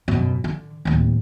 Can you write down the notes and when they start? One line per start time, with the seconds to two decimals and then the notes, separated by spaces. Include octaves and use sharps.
0.08 F#2 B2
0.44 D3
0.85 D1 D#2